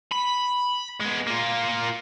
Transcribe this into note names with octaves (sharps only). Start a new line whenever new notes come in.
B5
G#3 B3
A#3 F4